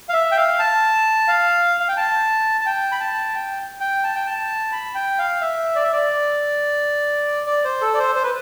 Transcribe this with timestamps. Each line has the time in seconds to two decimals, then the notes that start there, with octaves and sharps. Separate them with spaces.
0.09 F5
0.14 E5
0.32 G5
0.37 F5
0.59 A5
1.28 F5
1.80 F5
1.89 G5
1.97 A5
2.61 A5
2.66 G5
2.92 B5
3.00 A5
3.35 G5
3.80 G5
4.04 A5
4.15 G5
4.26 A5
4.72 B5
4.95 G5
5.18 F5
5.41 E5
5.75 D5
5.83 E5
5.92 D5
7.47 D5
7.64 C5
7.81 A4
7.94 D5
7.99 C5
8.15 C5
8.23 B4